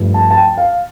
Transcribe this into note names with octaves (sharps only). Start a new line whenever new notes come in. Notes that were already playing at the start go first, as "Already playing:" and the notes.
Already playing: G2 F3 A3
A5
A5
G5
F5